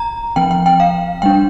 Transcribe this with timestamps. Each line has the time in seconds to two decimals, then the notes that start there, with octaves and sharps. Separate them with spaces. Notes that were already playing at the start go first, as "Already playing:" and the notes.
Already playing: A#5
0.36 F3 C4 G5
0.51 G5
0.66 G5
0.80 F5
1.22 G3 D4 G5